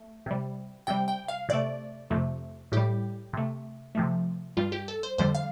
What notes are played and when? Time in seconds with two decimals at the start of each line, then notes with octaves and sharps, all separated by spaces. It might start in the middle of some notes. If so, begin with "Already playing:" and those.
Already playing: A3
0.26 C3 G3
0.87 C3 G3 G5
1.08 G5
1.28 F5
1.49 C3 A3 D5
2.10 F2 C3 A3
2.72 A2 G3 G4
3.33 C3 A3
3.95 C3 F3 A3
4.57 G2 G3 F4
4.72 G4
4.88 A4
5.03 C5
5.18 F2 D3 G3 C5
5.35 F5